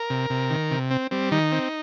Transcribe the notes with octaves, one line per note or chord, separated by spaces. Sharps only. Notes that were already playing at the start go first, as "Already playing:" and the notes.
Already playing: A#4
C3
C3
D#3
C3
C4
G3 C4
D#3 D#4
C4